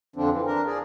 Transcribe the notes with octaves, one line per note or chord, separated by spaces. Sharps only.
F2 D3 F3 C4 D4
E3
D4 A#4
G#4 D5